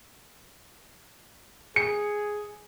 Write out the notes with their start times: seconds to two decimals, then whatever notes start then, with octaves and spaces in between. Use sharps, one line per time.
1.76 G#4 C#7